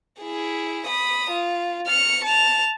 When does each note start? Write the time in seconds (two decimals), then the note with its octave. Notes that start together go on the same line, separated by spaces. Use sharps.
0.21 E4 G#4
0.87 B5 D#6
1.31 F4
1.87 F6 C#7
2.25 A5 F7